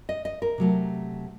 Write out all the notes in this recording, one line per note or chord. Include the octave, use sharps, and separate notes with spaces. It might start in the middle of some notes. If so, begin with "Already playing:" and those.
D#5
D#5
A#4
C3 F#3 A3